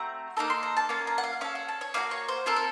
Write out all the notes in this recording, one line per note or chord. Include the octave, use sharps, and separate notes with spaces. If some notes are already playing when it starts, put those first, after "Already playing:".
Already playing: A3 C4 F#4 A#5
A#3 D#4 A4 A#5
C6
A#5
A5
A#3 C#4 F4 F5
A#5
F#5
F5
C#4 A4 F5
F#5
A5
C#5
A#3 D#4 F#4 F5
C#5
C5
C4 F4 A4 A#4
A#4